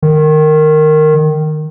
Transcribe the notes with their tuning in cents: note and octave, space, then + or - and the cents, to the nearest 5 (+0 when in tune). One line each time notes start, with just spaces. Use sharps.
D#3 -15